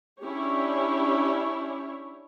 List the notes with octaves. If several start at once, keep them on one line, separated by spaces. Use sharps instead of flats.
C#4 D4 E4 G4 C#5